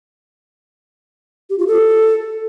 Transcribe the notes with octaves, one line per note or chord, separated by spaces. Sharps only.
G4
F4
A4